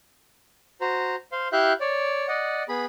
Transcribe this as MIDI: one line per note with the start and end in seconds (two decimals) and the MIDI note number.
0.81 1.16 66
0.81 1.16 72
0.81 1.16 82
1.32 1.48 72
1.32 1.48 77
1.32 1.48 84
1.52 1.73 64
1.52 1.73 67
1.52 1.73 76
1.52 1.73 77
1.52 1.73 90
1.52 1.73 91
1.80 2.28 73
1.80 2.28 74
2.28 2.63 74
2.28 2.63 75
2.28 2.63 78
2.69 2.85 59
2.69 2.85 68
2.69 2.85 83